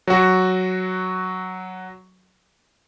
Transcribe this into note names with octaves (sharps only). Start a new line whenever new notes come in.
F#3 F#4